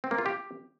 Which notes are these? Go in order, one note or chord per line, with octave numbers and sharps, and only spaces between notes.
C4
A#3
F4
G4